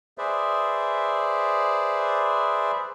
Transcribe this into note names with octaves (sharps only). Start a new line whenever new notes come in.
G#4 B4 C5 D5 E5